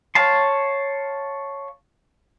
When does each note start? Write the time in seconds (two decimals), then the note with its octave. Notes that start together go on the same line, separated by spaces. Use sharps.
0.15 C#5 F5 A5 C6